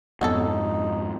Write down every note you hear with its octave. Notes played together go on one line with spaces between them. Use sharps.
F2 G#2 B3 C#4 D#4 A4